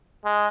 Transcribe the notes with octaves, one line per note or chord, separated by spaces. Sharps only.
G#3